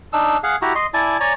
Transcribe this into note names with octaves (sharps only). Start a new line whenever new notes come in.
D4 D#4 E6
G#4 F5 F#5
E4 F#4 G4 A#5
D#5 C6
E4 D5 G#5 A5
C#5 D5 G#5 A#5